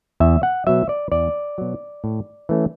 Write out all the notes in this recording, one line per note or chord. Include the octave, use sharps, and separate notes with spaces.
E2 E5
F#5
B2 F#3 E5
D5
E2 D5
B2 F#3
A2
E3 A3 C#4